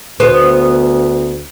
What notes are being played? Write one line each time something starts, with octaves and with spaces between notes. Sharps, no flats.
D2 B3 C5